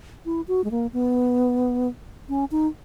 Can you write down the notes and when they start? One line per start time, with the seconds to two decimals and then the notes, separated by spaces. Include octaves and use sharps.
0.25 E4
0.48 F#4
0.64 G#3
0.71 A#3
0.93 B3
2.29 C#4
2.51 D#4